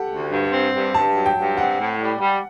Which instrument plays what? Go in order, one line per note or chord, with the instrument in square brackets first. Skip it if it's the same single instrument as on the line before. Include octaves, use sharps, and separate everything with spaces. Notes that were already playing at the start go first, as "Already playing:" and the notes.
Already playing: [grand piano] G4 A4 F#5
[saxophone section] D2
G2
C4
G2
[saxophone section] G2 [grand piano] A5
[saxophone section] F#3
[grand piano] G5
[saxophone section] G2
[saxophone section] C4 [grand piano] F#5
[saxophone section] A2
G3
G3